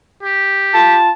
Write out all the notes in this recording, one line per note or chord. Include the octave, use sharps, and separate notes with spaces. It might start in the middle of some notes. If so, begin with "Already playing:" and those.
G4
F4 A5